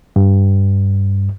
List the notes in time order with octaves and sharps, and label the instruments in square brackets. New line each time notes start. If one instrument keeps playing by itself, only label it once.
[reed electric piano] G2